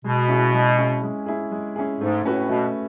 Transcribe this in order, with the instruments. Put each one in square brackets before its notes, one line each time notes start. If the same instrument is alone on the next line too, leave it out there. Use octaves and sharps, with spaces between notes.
[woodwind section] B2 [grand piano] G#3
[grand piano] C#4 E4 G#4
G#3
C#4 E4 G#4
G#3
C#4 E4 G#4
G#3
C#4 E4 G#4
[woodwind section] G#2 [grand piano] A3
[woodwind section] A2 [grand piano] C#4 F#4 B4
[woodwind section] B2 [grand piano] A3